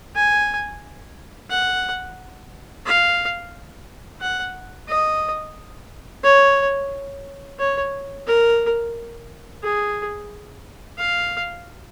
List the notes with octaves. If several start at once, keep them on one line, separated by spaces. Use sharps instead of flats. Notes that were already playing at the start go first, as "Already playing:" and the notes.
G#5
F#5
F5
F#5
D#5
C#5
C#5
A#4
G#4
F5